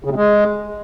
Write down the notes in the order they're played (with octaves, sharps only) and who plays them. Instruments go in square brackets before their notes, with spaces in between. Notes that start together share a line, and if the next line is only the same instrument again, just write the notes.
[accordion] C#3
C3
G#3